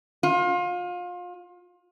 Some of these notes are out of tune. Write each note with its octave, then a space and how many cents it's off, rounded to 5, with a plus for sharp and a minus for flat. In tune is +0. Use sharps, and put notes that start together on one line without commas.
F4 +30